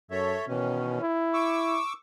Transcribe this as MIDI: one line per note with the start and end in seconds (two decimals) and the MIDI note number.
0.11 0.37 42
0.11 0.45 69
0.11 0.45 73
0.11 0.45 76
0.47 1.00 47
0.47 1.02 51
0.47 1.02 52
0.47 1.02 61
1.01 1.79 64
1.33 1.93 85
1.33 1.93 86
1.33 1.93 88